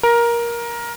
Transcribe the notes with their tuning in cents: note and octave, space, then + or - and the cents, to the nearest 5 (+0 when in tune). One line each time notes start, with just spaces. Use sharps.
A#4 +15